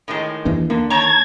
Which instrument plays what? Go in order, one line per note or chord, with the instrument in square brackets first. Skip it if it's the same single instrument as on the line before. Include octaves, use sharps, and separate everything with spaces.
[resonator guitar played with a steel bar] A2 D#3 G#3
[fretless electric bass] D#2 E3 D4
[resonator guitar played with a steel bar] D3 [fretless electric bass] A#3
[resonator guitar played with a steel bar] D#3 C#5 A#5 [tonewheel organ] A5 G#6